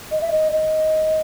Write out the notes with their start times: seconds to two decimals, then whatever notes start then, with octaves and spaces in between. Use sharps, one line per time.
0.11 D#5
0.21 E5
0.31 D#5
0.52 D#5